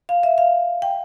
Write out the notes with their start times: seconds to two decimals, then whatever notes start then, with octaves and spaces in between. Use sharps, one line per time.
0.09 F5
0.23 E5
0.38 F5
0.82 G5